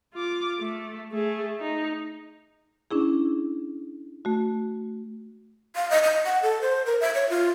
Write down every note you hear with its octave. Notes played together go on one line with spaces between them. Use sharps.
F4 D6
A3
A3 G#4
D#4
C#4 D4 E4 G#4
A3 F#4
F5
D#5
D#5
F#5
A4
C5
A#4
E5
C#5
F4